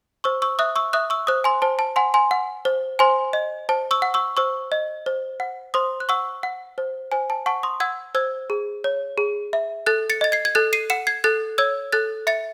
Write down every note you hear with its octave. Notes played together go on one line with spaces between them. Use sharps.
C5 C#6 E6
C#6 E6
E5 D#6 F#6
C#6 E6
E5 D#6 F#6
C#6 E6
C5 D#6 F#6
G#5 C6
C5 A5
A5
F#5 G#5 C6
G#5 C6
F#5
C5
C5 G#5 C6
D#5
C5 A5
C#6 E6
F#5
C#6 E6
C5 C#6 E6
D#5
C5
F#5
C5 C6 D#6
F#6
F#5 C#6 E6
F#5
C5
C5 G#5
A5
F#5 A5 C#6
C6 D#6
F#5 E6 G#6
C5 E6 G#6
G#4
C#5
G#4
E5
A4 F#6 A6
A6 C#7
D#5 A6
G#6 C7
G#6
A4 F#6 A6
C7 D#7
F#5 C#7 E7
G#6 C7
A4 F#6 A6
C#5 E6 G#6
A4 F#6 A6
E5 A6 C#7